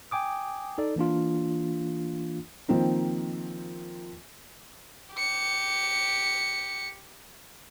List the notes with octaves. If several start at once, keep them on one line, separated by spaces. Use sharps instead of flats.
G5 G#5 D6 D#6
D#4 A4 D5
E3 A#3 D4 F4
D#3 F3 A#3 C4 D#4
G4 C#7